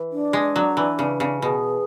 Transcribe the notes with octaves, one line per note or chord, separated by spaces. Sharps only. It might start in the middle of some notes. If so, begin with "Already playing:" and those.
Already playing: E3
D4
G#3
F#3
E3
C#3
C#3
B2 G#4